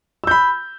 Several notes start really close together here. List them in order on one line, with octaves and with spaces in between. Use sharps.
E6 G6 B5